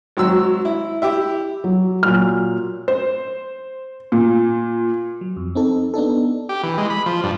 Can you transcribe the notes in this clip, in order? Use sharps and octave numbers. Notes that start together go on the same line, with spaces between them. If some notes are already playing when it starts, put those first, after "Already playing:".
G#1 F#3 E6
E4
E4 G4 E5
F#3
A#2 F#3 F6
C5
A#2
F#3
F2
C4 D#4 A4
B3 D4 D#4 A4
G4
E3
G#3
B5
F3
G2